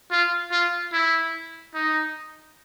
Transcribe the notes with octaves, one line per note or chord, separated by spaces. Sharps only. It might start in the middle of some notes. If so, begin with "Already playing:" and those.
F4
F4
E4
D#4